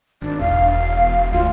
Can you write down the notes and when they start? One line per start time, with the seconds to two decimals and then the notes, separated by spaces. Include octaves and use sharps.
0.22 G#1 D4
0.40 E1 F5
1.33 D2 F4